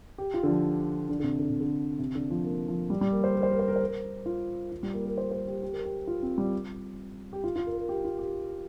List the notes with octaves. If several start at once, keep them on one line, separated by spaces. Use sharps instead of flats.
G4
F4
D3
F3
D3
D3
C3
D3
C3
D3
C3
D3
F3
A#3
F3
G3
G3
A#3
C5
A#4
C5
A#4
C5
A#4
C5
A#4
F4
F4
G3
A#3
A#4
C5
C5
G4
G4
A#4
G4
F4
C4
G3
G4
F4
F4
A#4
A#4
G4
F4
G4